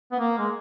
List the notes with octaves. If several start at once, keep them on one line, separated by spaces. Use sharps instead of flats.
B3
A#3
G#3